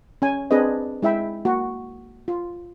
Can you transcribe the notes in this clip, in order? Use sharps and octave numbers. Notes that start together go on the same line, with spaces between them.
C#4 G#5
C4 D4 G#4 B4 D#5
G#3 E4 E5 G5 B5
A#3 F#4
F4